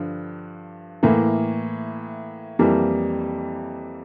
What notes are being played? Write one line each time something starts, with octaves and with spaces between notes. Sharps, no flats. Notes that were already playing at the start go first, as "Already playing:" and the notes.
Already playing: G2 D3 F3
A2 E3 A#3
F2 E3 G3 A#3